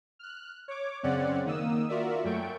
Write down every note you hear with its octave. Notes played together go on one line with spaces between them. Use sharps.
F6 F#6
C#5 D6
F#2 C#3 C4 C#4 D5 F#5
D#3 A#3 D#6 E6
F4 F#4 A#4 D5 E5
F#2 A3 G5 C#6 D7